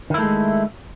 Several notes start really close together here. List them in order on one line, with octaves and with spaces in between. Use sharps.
D#3 E4 A3 G#3